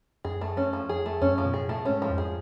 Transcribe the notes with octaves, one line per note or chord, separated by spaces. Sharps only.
F#2 G#4
A3
F2 C#4
F3
F2 G#4
A3
F#2 C#4
F3
B2
A2 G#4
A3
G#2 C#4
F3
F2
G#4